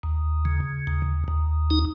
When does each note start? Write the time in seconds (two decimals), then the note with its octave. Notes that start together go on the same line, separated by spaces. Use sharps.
0.03 D#2
0.45 C#3
0.87 D#2
1.28 D#2
1.70 D#4